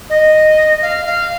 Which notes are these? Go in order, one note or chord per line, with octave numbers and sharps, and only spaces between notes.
D#5
F5
F5